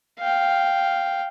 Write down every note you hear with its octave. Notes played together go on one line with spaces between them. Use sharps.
F5 G5